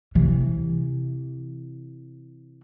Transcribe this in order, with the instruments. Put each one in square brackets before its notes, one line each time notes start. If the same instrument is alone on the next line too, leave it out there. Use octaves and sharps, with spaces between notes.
[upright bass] C3 E3